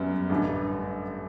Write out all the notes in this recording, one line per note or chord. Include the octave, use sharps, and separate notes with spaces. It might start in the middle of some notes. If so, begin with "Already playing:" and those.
Already playing: F#2 G3 B3
A1 G2 D3